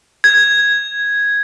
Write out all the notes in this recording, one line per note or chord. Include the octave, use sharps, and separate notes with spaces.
G#6